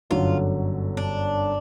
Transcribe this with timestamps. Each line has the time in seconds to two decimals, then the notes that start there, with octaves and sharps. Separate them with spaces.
0.10 G1 F#2 D3 F#3 F4
0.97 D4